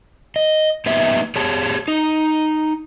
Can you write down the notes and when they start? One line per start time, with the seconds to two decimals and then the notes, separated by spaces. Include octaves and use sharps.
0.36 D#5
0.86 A#3 B3 D#4 G4 E5
1.36 G4 G#4 C#5 A5
1.88 D#4